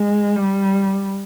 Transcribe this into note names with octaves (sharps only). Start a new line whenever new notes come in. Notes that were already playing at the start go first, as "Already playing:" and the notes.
Already playing: G#3
G3